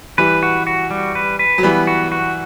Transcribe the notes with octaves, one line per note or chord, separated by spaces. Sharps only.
E3 G3 B4
F#4
F#4
G3
B4
B4
F#3
E3 G3 B3
F#4
F#4